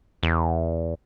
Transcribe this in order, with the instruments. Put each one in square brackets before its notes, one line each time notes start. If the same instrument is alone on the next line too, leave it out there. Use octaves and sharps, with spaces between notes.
[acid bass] E2